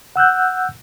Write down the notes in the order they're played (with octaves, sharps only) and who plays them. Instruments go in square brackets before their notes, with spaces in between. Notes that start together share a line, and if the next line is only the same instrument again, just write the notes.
[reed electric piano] F#5 E6 F#6 G6